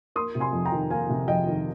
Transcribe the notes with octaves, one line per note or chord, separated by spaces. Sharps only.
A#3 C6 D#6
C3
G#5 C6
F2
G5 A#5
D#3
A#3 F5 G#5
C3
F2 D#5 G5
D#3